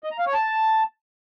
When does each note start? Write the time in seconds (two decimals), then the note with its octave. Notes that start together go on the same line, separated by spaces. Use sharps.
0.04 D#5
0.11 A#5
0.19 F5
0.26 C#5
0.34 A5